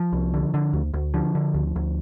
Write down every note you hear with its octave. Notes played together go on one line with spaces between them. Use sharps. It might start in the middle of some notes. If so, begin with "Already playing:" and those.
Already playing: F3
C2
D3
D3
D2
D2
D3 F3
D3
D2
D2